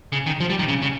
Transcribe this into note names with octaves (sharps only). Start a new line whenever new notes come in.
C#3
D#3
F3
G3
D#3
C#3
C#3